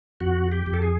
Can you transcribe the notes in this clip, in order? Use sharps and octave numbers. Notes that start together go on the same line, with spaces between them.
F2 F#4
G4
F2
A4
G#4